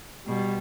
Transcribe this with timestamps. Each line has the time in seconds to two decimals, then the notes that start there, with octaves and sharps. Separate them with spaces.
0.27 B2 G3